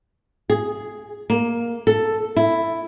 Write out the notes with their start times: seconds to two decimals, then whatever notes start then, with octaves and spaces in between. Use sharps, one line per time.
0.50 G#4
1.30 A#3
1.87 A4
2.37 E4